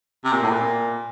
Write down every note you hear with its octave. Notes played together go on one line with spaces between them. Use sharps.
C3
A#2
A2
A#2